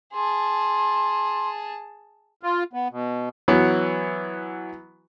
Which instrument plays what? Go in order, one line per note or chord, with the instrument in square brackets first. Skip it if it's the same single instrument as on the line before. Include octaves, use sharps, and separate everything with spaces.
[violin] G#4 A5 [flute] C6
[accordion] F4
B3
B2
[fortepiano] E3 F#3 B3